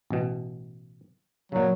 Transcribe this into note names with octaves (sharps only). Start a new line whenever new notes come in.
A1 B2
A#2 C#3 F#3